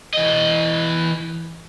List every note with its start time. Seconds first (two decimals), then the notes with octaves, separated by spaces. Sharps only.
0.13 E3 D#5